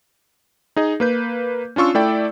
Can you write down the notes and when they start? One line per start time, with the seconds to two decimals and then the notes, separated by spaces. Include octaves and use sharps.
0.76 D#4 G#4 D#5
1.00 A#3 B4 G6
1.76 C#4 D4 F4 C#6 E6
1.95 A3 E4 A4 D5 G5